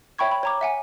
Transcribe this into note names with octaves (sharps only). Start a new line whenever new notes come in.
C#5 E5 G5 B5 C#6 G#6
B5
C#5 A#5 D6
E5 F#5 G#5